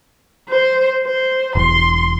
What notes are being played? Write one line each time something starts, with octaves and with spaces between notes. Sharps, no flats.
C5
C5
E1 C6